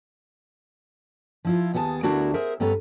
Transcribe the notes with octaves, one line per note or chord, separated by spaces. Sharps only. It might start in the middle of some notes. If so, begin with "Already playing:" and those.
F3 E4 F4
D#2 B3 G#4 A4 A5
D2 B3 D4 E4 F#4 A#4
G#4 A#4 C5 E5
G2 B3 C#4 A4 B4 A#5